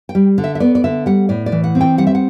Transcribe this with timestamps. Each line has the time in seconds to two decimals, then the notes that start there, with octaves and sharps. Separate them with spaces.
0.09 G5
0.15 G3
0.38 D3
0.44 E5
0.55 E5
0.60 B3 D5
0.75 D5
0.84 D3 E5
1.06 G3 F#5
1.29 A2 D5
1.46 D5
1.52 E3
1.64 F#5
1.75 C4
1.81 G5
1.98 G3 F#5
2.07 E5
2.15 F#5